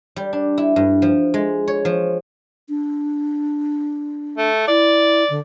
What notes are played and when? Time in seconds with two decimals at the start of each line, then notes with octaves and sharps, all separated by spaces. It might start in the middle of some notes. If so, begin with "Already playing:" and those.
0.16 G3
0.33 D4
0.58 E4
0.76 G2
1.02 F3
1.34 G#3
1.68 C#5
1.85 F3
2.69 D4
4.38 A3
4.68 E4 D5
5.30 D3